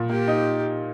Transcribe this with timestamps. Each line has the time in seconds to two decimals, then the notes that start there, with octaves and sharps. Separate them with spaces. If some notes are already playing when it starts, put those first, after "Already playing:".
Already playing: A#2
0.10 A#3 G4
0.28 D#4